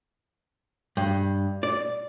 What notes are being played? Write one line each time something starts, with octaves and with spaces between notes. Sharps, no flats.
G2
D5